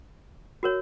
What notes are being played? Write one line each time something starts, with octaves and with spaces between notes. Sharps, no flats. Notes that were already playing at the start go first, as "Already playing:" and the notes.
F#4 A#4 C#5